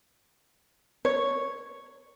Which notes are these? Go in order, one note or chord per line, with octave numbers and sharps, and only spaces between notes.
C#5